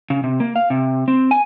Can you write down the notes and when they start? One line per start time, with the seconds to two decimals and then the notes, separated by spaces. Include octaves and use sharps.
0.10 C#3
0.24 C3
0.40 A#3
0.56 F5
0.70 C3
1.08 C4
1.31 G#5